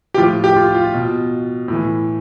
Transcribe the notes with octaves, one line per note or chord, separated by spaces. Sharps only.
G4
A2 F3 F4
G4
F4
F4
B2
A2 E3